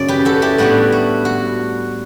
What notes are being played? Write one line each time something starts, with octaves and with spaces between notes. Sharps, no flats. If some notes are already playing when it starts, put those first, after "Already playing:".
Already playing: F#2 C#3 F#3 D5
G4 B4
F#4 A4
E4 G4
A2 G3 B3 D4 F#4
F#4
F#4